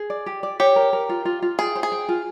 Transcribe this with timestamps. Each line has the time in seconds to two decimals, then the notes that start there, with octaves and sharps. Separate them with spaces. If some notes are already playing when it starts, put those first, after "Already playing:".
Already playing: G#4
0.10 D5
0.26 G4
0.43 D5
0.60 G4 C#5
0.76 A#4
0.93 A#4
1.09 F4
1.25 F4
1.42 F4
1.59 G#4 G5
1.76 C5
1.83 G#4
1.92 G5
2.09 F4